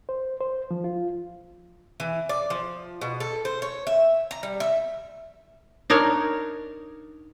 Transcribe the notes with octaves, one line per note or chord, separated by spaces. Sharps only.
C5
C5
F3
F4
E3
D5
F3
B2
A4
C5
C#5
E5
A#5
G3
E5
D4 D#4 A#4 C#5